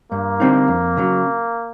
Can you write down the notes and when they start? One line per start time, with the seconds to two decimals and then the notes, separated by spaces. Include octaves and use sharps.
0.12 G2 A#3
0.40 D3 G3 C4 D#4
0.68 F2
0.97 C#3 F#3